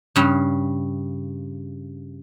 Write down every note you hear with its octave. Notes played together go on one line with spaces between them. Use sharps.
G2 C#3